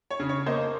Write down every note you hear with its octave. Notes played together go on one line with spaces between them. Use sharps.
C#5
C#3
C#5
A#3 C5 D#5